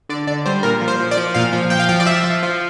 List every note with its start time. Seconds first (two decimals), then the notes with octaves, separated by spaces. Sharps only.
0.09 D3 D5
0.27 D3 D5
0.46 G3 C5
0.63 A#2 A#4
0.81 F3
0.88 C5
1.00 F3
1.11 D5
1.17 F3
1.34 A#2 F5
1.53 F3
1.70 F3 G5
1.80 F5
1.89 F3 G5
2.00 D5
2.06 F3 E5
2.24 F3
2.43 F3